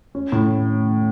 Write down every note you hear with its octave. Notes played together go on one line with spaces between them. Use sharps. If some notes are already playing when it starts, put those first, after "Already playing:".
C#4
A2